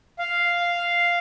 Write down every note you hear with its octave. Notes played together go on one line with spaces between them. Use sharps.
F5